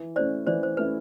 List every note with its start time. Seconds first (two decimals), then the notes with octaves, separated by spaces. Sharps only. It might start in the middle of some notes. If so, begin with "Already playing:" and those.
Already playing: E3
0.16 A3 C#4 E4 C5 D5
0.47 E3 C5 D5
0.63 C5
0.77 A3 C#4 E4 B4